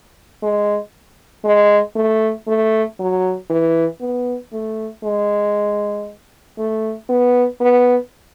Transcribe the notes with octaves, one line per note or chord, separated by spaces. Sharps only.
G#3
G#3
A3
A3
F#3
E3
B3
A3
G#3
A3
B3
B3